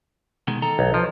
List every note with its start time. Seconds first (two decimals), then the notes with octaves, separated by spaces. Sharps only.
0.48 B2 D#3 G#3
0.62 D#3 A4 A#5
0.79 B1
0.94 F3